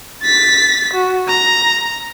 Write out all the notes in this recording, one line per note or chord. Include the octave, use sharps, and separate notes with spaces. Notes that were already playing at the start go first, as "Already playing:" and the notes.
A6 B6
F#4
A#5